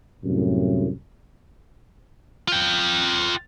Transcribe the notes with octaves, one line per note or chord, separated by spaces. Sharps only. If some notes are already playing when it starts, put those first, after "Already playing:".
C2 F#2 A2
F4 G5